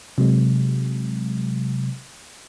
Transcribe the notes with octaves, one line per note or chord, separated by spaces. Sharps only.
C3 F#3 G#3